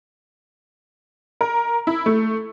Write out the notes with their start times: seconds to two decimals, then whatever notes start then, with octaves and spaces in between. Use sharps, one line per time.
1.41 A#4
1.87 E4
2.06 A3